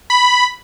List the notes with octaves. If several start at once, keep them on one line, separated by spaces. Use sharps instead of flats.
B5